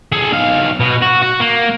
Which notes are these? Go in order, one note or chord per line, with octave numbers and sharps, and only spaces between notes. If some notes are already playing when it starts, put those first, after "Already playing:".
G#4 A4
B1 F5
B2
F#4
F#4
A#3